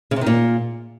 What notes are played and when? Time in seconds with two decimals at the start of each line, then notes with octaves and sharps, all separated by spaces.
0.11 C#3
0.16 C3
0.21 D#3
0.26 A#2